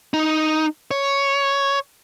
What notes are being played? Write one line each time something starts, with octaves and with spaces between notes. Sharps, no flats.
D#4
C#5